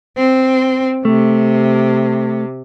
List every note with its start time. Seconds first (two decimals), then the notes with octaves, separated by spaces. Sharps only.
0.17 C4
1.05 C3 A3